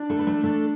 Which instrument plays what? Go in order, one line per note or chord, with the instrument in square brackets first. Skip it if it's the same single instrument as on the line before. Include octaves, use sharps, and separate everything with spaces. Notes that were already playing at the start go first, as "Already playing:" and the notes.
Already playing: [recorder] D4
[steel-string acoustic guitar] A3 A4
B4
A3 A4
A3 A4